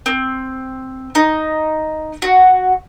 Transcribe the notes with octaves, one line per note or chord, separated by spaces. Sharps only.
C4
D#4
F#4